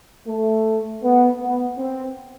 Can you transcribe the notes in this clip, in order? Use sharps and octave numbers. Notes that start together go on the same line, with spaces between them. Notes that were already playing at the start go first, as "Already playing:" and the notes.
A3
B3
B3
C4